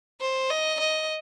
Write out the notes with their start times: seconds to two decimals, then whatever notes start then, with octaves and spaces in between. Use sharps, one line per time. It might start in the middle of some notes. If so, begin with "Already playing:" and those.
0.21 C5
0.50 D#5
0.80 D#5